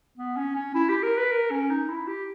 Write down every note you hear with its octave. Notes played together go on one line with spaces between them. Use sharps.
B3
C#4
C#4
E4
G4
A#4
B4
A#4
C#4
D#4
E4
G4